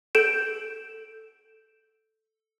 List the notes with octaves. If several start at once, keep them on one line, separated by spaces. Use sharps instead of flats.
A4 G6 D7 E7